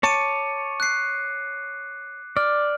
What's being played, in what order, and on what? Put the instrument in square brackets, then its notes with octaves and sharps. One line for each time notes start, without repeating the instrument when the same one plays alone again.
[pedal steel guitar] C#5 A5 [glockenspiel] D6 C#7 D#7
[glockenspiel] F#6 C7
[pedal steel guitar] D5 [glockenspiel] F6